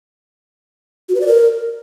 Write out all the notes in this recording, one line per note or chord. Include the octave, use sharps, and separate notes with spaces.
F#4
B4
D5
A#4